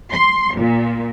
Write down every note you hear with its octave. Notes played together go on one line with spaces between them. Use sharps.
C6
A#2